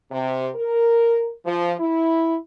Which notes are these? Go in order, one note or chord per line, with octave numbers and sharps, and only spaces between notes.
C3
A#4
F3
E4